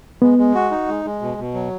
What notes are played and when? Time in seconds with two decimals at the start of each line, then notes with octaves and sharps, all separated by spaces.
0.22 G#3 B3
0.38 G#3
0.55 F#4
0.71 D#4
0.88 G#3
1.05 G#3
1.22 B2
1.38 B2
1.54 F#3